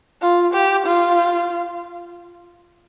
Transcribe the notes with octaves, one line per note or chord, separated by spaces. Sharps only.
F4
G4
F4